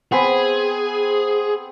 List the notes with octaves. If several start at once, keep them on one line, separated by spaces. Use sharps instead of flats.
B3 C4 G#4 B5